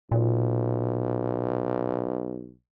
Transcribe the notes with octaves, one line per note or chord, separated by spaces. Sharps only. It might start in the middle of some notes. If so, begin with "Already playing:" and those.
B1 A#2